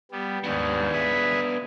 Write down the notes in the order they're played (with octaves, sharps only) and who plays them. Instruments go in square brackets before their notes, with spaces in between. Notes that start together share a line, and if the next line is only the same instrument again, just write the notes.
[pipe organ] G3 B3
[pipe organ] D#2 G#2 [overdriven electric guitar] B3 D4
[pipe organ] G#4 B4 E5